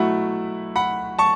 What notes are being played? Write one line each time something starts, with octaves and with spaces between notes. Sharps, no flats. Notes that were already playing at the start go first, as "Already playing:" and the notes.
Already playing: B2 F#3 A3 E4 F#5 B5
F#5 B5
A5 C#6